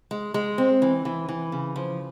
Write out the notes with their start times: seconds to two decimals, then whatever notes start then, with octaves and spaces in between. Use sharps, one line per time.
0.11 G#3
0.34 G#3
0.58 C4
0.82 E3
1.05 E3
1.29 E3
1.52 C#3
1.76 F3